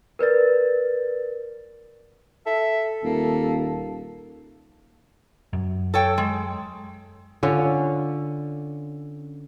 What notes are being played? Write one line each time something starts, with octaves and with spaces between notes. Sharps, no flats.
A#4 B4 D5 A6
A4 E5
D#1 A#3
F#2
A4 C#5 G5
G#3
D3 C#4 F4